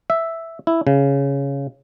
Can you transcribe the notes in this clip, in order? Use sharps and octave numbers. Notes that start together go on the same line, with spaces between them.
E5
E4
C#3